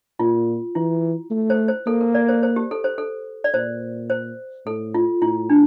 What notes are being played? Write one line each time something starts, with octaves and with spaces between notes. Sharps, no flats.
A#2 F4
E3 E4
A3
C5
C5
A#3 A4
A#4
D5
C5
C5
G4
A4
C5
A4
D5
A#2 C5
C5
A2 A4
F4
A2 E4
D4